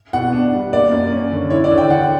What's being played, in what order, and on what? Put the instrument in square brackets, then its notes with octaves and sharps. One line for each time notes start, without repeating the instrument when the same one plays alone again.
[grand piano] B2 [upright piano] F#5
[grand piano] D4
G3
[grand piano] A#3 [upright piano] D5
[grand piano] F#2
C#4
D3
[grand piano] E4 [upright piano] C#5
[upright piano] D5
[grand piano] D3
[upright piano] G5
[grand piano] D3 [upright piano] F#5